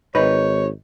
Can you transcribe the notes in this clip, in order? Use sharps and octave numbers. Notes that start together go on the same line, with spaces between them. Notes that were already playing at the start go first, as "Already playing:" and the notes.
G#1 D#4 B4 C#5